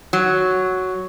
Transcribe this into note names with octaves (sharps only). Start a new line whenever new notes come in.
F#3